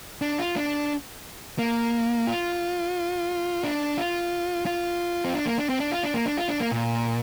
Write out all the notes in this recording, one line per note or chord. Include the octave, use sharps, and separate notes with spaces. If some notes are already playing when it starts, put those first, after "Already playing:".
D4
F4
D4
A#3
F4
D4
F4
F4
C4
D4
A#3
D4
C4
D4
F4
D4
A#3
D4
F4
D4
A#3
A#2